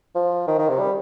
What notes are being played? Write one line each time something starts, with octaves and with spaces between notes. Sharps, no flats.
F3
D#3
D#3
C3
G3